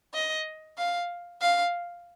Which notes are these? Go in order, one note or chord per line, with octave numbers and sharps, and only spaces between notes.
D#5
F5
F5